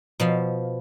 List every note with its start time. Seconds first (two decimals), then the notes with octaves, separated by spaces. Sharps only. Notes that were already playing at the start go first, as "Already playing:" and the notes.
0.20 B2 F3 F5